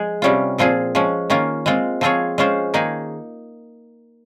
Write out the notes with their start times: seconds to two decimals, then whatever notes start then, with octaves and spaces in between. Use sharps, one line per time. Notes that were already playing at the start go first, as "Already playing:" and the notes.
Already playing: F3 G#3 G#4
0.22 C3 G3 C#4 F4
0.58 A#2 F3 C4 F4 G#4
0.95 F3 G#3 C#4
1.30 D#3 A#3 C#4 F4
1.66 G#3 C4 F4
2.01 F3 C4 F4 G#4 C#5
2.38 G#3 C#4 F4 C5
2.74 D#3 A#3 D#4 G#4